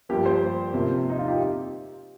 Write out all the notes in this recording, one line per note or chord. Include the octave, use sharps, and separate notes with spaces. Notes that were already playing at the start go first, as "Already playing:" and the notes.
G2 F3 A#3 G4
C5
C3 F3 A#3
D#4
F4
G4